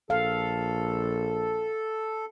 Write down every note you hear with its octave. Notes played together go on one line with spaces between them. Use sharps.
A#1 A4 F5